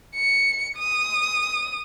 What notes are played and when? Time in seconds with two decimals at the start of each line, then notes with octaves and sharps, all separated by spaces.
0.15 C#7
0.78 D#6